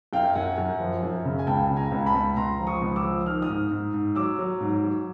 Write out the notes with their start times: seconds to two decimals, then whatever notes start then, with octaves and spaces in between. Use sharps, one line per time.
0.13 F#2 F5 G5
0.35 F#2 F#5 G#5
0.58 F#2
0.80 F3
1.03 F#2
1.25 C#3
1.39 G#5
1.47 C#2 G5 A5
1.70 C#3
1.76 G#5 A#5
1.92 C#2
2.06 A5 B5
2.15 C#2
2.36 C#2 A#5 C6
2.59 F3
2.67 C#6 D#6
2.82 C#2
2.96 D6 E6
3.04 F3
3.26 D#3 F6
3.42 D#6 F6
3.48 G#2
3.71 G#2
3.93 G#2
4.15 F#3 D6 E6
4.39 F#3
4.60 G#2
4.83 F#3